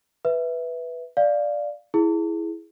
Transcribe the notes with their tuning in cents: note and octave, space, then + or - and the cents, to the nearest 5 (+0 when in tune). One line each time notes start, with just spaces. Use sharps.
B4 +0 E5 -5
D5 +0 F5 +0
E4 +0 G#4 +10